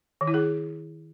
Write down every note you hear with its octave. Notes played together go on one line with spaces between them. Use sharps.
D#3
E4
G#4